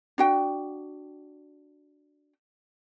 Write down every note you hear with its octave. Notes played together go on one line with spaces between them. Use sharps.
D4 F#4 G5